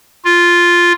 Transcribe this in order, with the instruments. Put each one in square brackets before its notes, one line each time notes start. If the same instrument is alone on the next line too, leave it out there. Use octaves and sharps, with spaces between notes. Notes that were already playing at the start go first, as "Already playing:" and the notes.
[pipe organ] F4